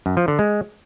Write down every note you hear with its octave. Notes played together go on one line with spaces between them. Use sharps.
F#2
F3
D3
G#3